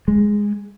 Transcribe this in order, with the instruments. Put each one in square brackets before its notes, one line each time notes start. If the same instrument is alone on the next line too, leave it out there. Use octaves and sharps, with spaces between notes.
[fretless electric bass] G#3